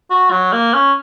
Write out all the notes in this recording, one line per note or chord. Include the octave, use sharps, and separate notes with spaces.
F#4
F#3
A#3
C#4